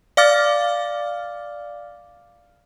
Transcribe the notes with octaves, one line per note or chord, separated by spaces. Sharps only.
D5 F5 D6 F6 A6